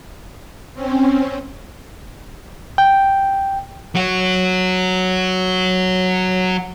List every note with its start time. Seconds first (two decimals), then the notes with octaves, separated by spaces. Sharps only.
0.75 C4 C#4
2.78 G5
3.95 F#3 F#4